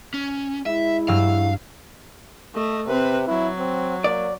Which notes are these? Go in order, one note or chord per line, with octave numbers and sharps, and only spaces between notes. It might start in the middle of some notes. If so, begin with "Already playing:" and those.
C#4
G#3 E4 E5
G2 F#3 F5 E6
A3 D#5
C3 C4 B4
F#3 E4
C4
A#3 D5